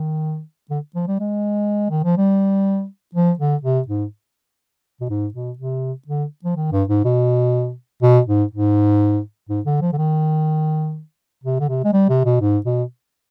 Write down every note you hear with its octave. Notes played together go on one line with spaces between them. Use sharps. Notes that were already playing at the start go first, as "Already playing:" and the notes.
Already playing: D#3
D3
F3
G3
G#3
D#3
F3
G3
F3
D3
C3
G#2
B2
G#2
B2
C3
D3
F3
D#3
G2
G#2
B2
B2
G#2
G#2
G#2
D3
F3
D3
D#3
C3
D3
C3
G#3
G3
C3
B2
G#2
B2